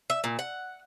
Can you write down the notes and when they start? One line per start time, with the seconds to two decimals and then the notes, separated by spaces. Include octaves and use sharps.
0.10 E5
0.24 A#2
0.39 F#5